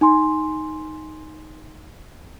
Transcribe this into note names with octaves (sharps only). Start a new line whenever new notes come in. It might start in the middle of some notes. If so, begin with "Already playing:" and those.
D#4 G#5 C6